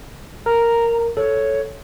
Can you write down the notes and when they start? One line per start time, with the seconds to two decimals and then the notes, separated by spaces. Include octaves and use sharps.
0.46 A#4 A#5
1.17 A4 C#5